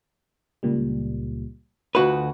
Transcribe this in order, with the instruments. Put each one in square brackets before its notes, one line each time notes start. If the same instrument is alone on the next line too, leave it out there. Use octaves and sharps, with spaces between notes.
[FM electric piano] C#2 A#2 G3
[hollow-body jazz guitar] D2 F#4 B4 [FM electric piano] F4 D#5